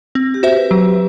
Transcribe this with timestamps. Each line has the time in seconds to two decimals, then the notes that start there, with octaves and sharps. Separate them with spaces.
0.15 C4
0.34 G4
0.43 F#4 C5 E5
0.53 B4
0.71 F#3